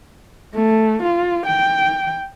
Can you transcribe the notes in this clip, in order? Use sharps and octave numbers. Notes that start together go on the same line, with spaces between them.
A3
F4
G5